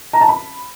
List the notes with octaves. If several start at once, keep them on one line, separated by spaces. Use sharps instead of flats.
A#5
A5
B5